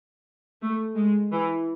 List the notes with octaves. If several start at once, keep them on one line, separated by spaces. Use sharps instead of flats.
A3
G#3
E3